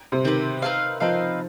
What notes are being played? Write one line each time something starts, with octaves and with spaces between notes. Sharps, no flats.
C3
D#3 C4 G4 B4
C4 D#4 B4 F5
F3 C4 D#4 B4 F5